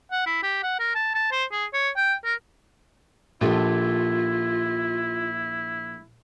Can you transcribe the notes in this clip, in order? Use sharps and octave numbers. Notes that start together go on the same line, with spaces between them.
F#5
E4
G4
F#5
A#4
A5
A5
C5
G#4
C#5
G5
A#4
A#1 A#2 E4 F4 G4 A4